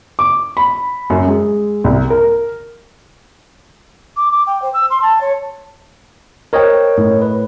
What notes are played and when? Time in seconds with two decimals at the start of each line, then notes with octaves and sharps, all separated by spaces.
0.19 D6
0.57 B5
1.10 F#2
1.27 G#3
1.84 C2
2.10 A#4
4.16 D6
4.31 D6
4.46 G5
4.62 C5
4.73 E6
4.90 C6
5.01 A5
5.21 C#5
6.53 A#4 C5 C#5 D#5 G5
6.97 A2
7.22 B4